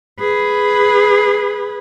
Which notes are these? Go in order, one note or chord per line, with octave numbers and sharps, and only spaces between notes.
G#4 B4